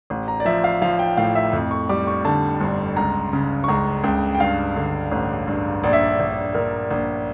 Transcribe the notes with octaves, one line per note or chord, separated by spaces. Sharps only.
A1
A#5
D5
F3 E5
F5
F3 F5
G5
A2 F5
E5
F2
C#6
G3 D6
C#6
D3 A5
G1
C#2 A#5
C#3
C#6
C#2 A#5
C#2 G5
G5
G2 F5
D3
A1
G2
A#1 D5
E5
D5
A#1
A#1 A#4
A#1